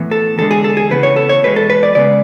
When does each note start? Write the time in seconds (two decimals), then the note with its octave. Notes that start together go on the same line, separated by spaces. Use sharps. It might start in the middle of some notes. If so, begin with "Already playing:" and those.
Already playing: A2 E3 B3
0.11 A4
0.38 E2 D3 G#3 A4
0.51 G#4
0.64 A4
0.77 G#4
0.90 C#3 E3 B3 B4
1.03 C#5
1.16 A4
1.29 C#5
1.43 E2 B2 G#3 B4
1.56 A4
1.70 B4
1.83 D5
1.95 C#3 G#3 B3 D5